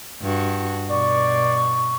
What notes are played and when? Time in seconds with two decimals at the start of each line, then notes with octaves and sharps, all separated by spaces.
0.22 G2 F#4
0.91 B2 D5 C#6